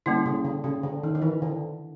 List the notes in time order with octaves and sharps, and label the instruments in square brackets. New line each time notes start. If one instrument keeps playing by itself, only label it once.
[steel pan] D3 [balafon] G3 A#3 C#4 E4
[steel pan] C#3
D3
C#3
D3
D#3
D#3
E3
D3